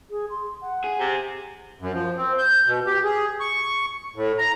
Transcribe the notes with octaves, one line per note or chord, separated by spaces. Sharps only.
G#4
C6
F#5
G#4
C3
F#2
F3
C4
G6
B2
G4
G#4
C#6
A2
A#5